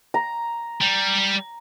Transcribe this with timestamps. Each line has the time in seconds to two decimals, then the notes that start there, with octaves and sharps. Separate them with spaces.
0.14 A#5
0.81 G3